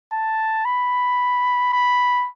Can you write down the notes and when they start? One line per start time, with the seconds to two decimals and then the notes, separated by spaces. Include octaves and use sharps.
0.13 A5
0.65 B5
1.73 B5